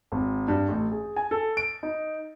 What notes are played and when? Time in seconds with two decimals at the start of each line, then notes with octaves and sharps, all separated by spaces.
0.12 G#1
0.48 G2
0.69 A1
0.91 G#4
1.16 G#5
1.31 A4
1.57 D7
1.83 D#4